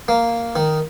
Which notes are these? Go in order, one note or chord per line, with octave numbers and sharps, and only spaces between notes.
A#3
D#3